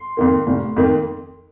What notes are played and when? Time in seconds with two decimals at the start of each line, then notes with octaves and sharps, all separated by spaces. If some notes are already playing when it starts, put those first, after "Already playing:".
Already playing: C6
0.17 F2 D#3 A#3
0.47 F1
0.76 F2 D#3 A#3